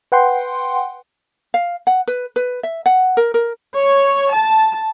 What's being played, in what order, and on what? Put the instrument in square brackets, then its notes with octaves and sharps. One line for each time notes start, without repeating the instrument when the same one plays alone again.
[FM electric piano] B4 F#5 G5 C6
[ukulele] F5
F#5
B4
B4
E5
F#5
A#4
A#4
[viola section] C#5
A5